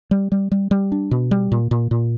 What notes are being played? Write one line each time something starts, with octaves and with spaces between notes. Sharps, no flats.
G3
G3
G3
G3
D4
B2
G3
A#2
A#2
A#2